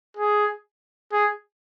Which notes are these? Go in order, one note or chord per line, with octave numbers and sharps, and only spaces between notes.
G#4
G#4